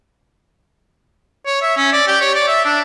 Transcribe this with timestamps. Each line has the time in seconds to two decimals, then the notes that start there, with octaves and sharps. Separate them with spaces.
1.46 C#5
1.62 E5
1.77 C#4
1.92 D5
2.07 G4
2.21 C#5
2.35 D5
2.48 E5
2.65 D4